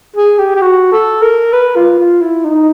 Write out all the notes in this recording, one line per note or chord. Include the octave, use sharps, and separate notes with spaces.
G#4
G4
G4
F#4
A4
A#4
B4
F4
F4
E4
D#4